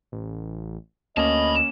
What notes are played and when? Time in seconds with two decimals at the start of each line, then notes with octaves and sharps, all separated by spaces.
0.12 A1
1.17 D2 A#3 C#4 D#5 A5 B5